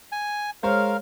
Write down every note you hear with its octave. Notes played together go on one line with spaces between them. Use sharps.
G#5
G#3 A#4 C5 C#5 F5